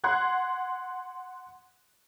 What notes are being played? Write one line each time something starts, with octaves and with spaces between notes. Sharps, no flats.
F#5 C6 F#6 G#6